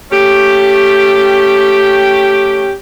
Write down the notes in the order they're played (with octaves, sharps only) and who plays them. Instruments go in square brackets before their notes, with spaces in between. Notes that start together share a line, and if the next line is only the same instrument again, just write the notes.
[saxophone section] A3 C#4 G4